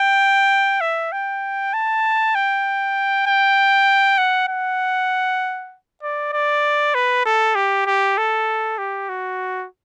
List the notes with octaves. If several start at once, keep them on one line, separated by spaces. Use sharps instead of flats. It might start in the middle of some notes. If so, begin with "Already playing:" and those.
Already playing: G5
E5
G5
A5
G5
G5
F#5
F#5
D5
D5
B4
A4
G4
G4
A4
G4
F#4